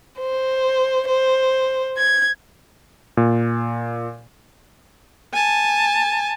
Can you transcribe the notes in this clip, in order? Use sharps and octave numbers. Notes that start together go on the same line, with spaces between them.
C5
C5
G#6
A#2
G#5 A5